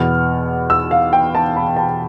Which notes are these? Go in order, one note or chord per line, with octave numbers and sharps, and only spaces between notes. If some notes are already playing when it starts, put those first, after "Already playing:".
Already playing: E2 B2 B3 F6
E6
F5
G5
A5
B5
A5